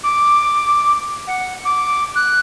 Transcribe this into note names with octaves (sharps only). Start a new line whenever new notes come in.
D6
F#5
D6
F#6